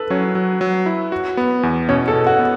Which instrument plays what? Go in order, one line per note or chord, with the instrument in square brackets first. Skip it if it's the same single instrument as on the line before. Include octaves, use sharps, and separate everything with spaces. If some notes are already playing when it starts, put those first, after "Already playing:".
Already playing: [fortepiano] A4 B4
[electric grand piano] F#3 [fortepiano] C#4
[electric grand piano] F#3
F#3
E4
F#4
B3
E2
[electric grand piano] B2 [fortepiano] C#4
[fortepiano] A4
[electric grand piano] B2
[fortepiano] F#4
[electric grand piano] B3